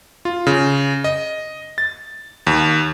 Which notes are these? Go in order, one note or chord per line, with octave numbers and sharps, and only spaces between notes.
F4
C#3
D#5
A6
D#2